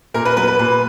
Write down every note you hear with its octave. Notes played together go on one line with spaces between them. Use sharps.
A#2 A#4
B4
F#3 B4
B4
A#2 B4